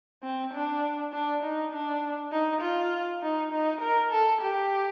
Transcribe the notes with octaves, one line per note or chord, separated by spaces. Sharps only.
C4
D4
D4
D#4
D4
D#4
F4
D#4
D#4
A#4
A4
G4